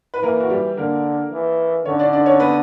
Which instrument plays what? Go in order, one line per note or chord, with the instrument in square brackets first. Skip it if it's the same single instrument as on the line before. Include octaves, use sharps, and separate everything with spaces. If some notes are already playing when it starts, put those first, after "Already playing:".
[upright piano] B4
[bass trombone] E3 [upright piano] A#3 A#4
[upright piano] F#4
G3 G4
[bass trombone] D3 [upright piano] A#3 A#4
[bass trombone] E3
[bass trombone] D3 [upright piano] C#4 C#5
[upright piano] D4 D5
D4 D5
C#4 C#5
B3 B4